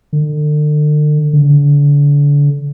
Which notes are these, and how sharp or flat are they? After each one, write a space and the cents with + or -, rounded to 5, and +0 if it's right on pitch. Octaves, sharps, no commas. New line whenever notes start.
D3 +35
D3 -30